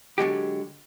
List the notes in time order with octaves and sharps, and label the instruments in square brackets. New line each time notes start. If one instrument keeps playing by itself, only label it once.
[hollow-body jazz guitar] D3 F#3 G#3 G4